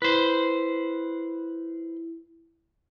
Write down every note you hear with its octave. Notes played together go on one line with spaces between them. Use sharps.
E4 B4 C5